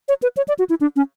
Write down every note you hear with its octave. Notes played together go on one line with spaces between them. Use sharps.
C#5
B4
C#5
D5
F#4
E4
D4
C#4